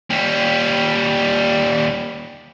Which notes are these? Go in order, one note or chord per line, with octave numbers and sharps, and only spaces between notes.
D#2 G3